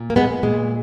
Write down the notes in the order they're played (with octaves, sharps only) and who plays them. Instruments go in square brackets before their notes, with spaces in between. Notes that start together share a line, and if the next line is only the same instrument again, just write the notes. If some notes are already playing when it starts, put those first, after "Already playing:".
Already playing: [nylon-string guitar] A#2
A#3
G#3 B3
A#2 G#3